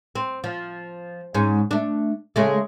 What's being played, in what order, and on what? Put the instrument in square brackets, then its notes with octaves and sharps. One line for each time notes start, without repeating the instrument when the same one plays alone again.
[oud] C4
F3
G#2 C#4
A3 D4
C#3 G#3 A3